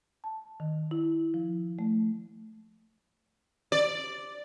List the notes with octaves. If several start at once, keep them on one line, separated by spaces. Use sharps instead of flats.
A5
D#3
E4
F3
A3
D5